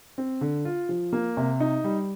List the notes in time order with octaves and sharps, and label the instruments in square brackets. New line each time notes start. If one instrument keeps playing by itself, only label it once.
[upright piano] C4
D3
F4
F3
A#3
C3
D#4
G3